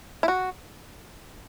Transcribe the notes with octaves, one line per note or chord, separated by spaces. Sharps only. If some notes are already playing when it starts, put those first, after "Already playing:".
E4
F#4